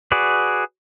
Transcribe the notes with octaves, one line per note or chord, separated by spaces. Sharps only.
F#4 G#4 B4 D5